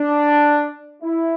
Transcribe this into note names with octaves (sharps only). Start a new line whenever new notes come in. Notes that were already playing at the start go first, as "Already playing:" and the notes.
Already playing: D4
E4